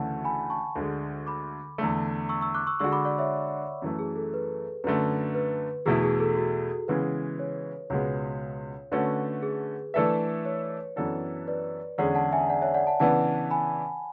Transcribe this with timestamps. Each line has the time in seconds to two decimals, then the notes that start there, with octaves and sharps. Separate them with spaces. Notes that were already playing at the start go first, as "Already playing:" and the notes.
Already playing: D2 C#3 E3 A3 D4 F#5 A5
0.24 G#5 B5
0.50 A5 C#6
0.76 D2 D3 G#3
1.26 B5 D6
1.78 E2 D3 A3
2.29 C#6 E6
2.41 C#6 E6
2.55 D6 F#6
2.67 C#6 E6
2.80 D3 G#3 D4 F#4 C#6 E6
2.92 B5 D6
3.05 D5 F#5
3.18 C#5 E5
3.82 F#2 E3 A3
3.99 G#4
4.16 A4
4.34 B4
4.84 F#2 D3 A3 B4
5.35 B4
5.86 E2 B2 A3 E4 G#4
6.03 G#4
6.20 A4
6.37 F#4
6.88 C#3 E3 G#3 B3 B4
7.39 C#5
7.90 C#2 B2 G#3 B3 C#5
8.92 D3 A3 C#4 F#4 B4
9.43 G#4
9.94 E3 A3 D4 A4 B4 E5
10.45 C#5
10.96 F#2 E3 B3 D4 A4
11.48 B4 D5
11.98 E2 D3 G#3 C#4 G#4 D5 F#5
12.15 F#5 A5
12.32 E5 G#5
12.50 D5 F#5
12.62 C#5 E5
12.74 D5 F#5
12.87 F#5 A5
13.00 C#3 E3 B3 D4 F#5 A5
13.51 G#5 B5